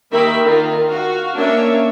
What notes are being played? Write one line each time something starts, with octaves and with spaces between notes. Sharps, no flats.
D#3 A#3 G4 A#4 E5 B5
D#3 F4
F#4 F5
A#3 C#4 D4 C#5 E5